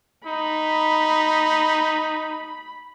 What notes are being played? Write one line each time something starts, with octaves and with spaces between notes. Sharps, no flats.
D#4 B5